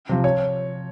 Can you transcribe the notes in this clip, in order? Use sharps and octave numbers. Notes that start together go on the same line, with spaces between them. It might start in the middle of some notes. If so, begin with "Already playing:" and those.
C3 F3
C#5